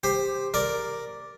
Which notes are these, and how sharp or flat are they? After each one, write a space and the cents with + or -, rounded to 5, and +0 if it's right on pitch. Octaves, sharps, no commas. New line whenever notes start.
G4 +15 C5 +0
A#4 +0 D5 +0